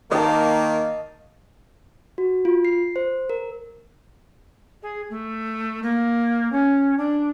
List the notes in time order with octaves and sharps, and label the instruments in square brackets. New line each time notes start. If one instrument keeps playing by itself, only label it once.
[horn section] D#3 A#3 [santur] D#5 A5
[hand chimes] F#4
F4
C7
C5
A#4
[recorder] G#4
A3
A#3
C#4
D4